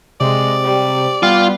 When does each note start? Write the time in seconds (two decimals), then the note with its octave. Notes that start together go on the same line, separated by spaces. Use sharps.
0.21 C3 G#3 D5
0.63 G3
1.23 G3 B3 F4